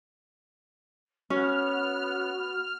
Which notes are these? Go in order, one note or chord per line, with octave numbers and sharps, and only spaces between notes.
B3 C#4 F#4 F6